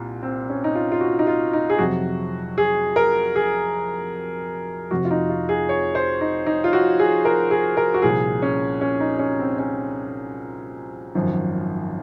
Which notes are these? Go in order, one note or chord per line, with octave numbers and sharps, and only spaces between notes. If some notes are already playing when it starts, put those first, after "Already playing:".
Already playing: C2 A#2
C4
C#4
D#4
F4
F4
F#4
D#4
F4
D#4
G#4
F2 C3 F#3 F#4
G#4
A#4
G#4
F1 F2 C3 F3 F#4
F4
D#4
F4
G#4
C#5
C5
D#4
D#4
F4
F#4
G#4
A#4
G#4
A#4
F#4
C2 A#2 F3 G#4
C#4
C#4
D#4
C#4
C4
C#4
G#1 F#2 F3